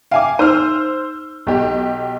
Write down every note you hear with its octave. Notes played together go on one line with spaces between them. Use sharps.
E5 F5 G5 G#5 D6
D#4 C5 E6 F6
B1 G4